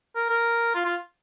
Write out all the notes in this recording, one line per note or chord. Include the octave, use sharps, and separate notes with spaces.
A#4
A#4
F4
F4